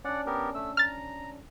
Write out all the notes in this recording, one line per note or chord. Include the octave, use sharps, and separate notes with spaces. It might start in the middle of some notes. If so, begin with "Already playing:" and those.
C#4 D4 D5 F#5
B3 G4 A#4
A3 E6
A#5 F6 A6